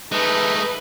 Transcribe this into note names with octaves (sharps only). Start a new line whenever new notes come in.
G#3 A3 D#4 B4